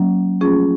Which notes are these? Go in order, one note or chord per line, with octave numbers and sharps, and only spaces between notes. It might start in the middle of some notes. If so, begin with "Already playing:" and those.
Already playing: F#3 A#3 C#4
F3 A3 C#4 F4 G#4